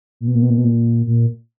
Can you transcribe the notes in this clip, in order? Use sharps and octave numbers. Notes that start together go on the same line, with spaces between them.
A#2
B2
A#2
B2
A#2
B2
A#2
A#2